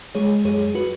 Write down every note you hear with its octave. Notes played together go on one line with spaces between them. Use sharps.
G#3 G#4 C#5
F#2 G#4 C#5
F#4 B4